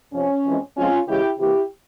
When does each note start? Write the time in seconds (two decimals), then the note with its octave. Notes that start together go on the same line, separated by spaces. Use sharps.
0.13 F2 C3 F3 C#4
0.45 F2 E3 G#3 C4
0.76 C#3 F3 G#3 C4 C#4 F4
1.07 C#3 E3 G#3 E4 G4
1.39 C3 E3 A#3 E4 G4